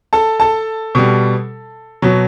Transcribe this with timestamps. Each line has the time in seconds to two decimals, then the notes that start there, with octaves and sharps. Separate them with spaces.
0.13 A4 A5
0.40 A4 A5
0.95 B2 G3
2.02 B2 F#3